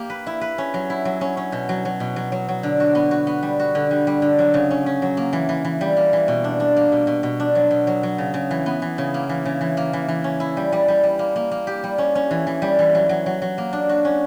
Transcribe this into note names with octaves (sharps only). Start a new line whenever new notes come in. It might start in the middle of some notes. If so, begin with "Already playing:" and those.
Already playing: A#3 G4
B4
E4
B4
C#4
F#3
E4
F#3
C#4
C#4
B2
F#3
F#3
B2
F#3
F#3
F#3
D3
F#4
B3
F#4
B3
G3
F#4
D3
G3
G3
D3
F#3
C#3
C#4
C#4
F#3
A#3
E3
E3
E3
G3
A#3
E3
B2
D4
D4
A#3
B2
B2
B2
D4
F#3
B2
F#3
F#3
C#3
C#3
E3
B3
E3
C#3
A#3
E3
C#3
E3
A#3
E3
E3
C#4
E4
G3
G3
G3
G3
A#3
A#3
A#3
G4
G3
C#4
C#4
E3
E3
G3
E3
F#3
F#3
F#3
F#3
A#3
D4
F#4
C#4